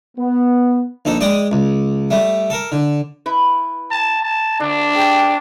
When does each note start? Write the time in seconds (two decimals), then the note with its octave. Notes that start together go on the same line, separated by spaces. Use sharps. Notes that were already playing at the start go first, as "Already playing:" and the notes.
0.18 B3
1.05 A#1 D#4 A4
1.21 G#3 D5 G5 D#6
1.52 C#2
2.11 G3 A3
2.50 A4 A#4
2.72 D3
3.26 E4 B4
3.91 A5
4.22 A5
4.60 D3 D4
4.96 G#4 G5